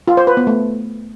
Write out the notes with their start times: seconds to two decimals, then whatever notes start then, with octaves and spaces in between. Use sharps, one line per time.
0.08 F4
0.17 C5
0.27 B4
0.37 B3
0.47 A3